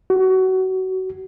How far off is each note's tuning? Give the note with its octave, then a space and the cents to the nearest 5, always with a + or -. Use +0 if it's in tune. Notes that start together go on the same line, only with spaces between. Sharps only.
F#4 +25